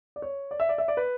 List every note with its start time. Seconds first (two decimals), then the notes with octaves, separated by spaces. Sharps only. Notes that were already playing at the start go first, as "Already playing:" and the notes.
0.16 D5
0.22 C#5
0.51 D5
0.60 E5
0.69 D5
0.78 E5
0.88 D5
0.97 B4